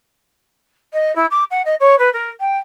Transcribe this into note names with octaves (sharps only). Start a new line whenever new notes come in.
D#5
E4
D6
F#5
D#5
C#5
B4
A#4
G5